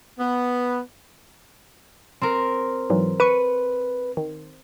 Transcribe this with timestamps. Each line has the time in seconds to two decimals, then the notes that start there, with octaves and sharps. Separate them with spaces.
0.20 B3
2.22 C4 A#4
2.90 G#2 E3 F#3
3.20 B4 C#6 C#7 D#7
4.17 D#3